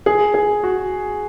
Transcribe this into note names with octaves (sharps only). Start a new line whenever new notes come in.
G#4
G#4
F#4